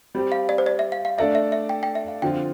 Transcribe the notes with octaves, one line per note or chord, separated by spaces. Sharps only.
G3 C4 G4
F5
D5
C5
D5
E5
F5
F5
A3 D4 A4 D5 E5
E5
E5
G5
G5
E5
F5
D3 F3 C4 F4 G5